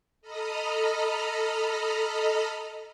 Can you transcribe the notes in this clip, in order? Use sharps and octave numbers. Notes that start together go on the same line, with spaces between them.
A4 D#5 A#5 B5 D#6 F6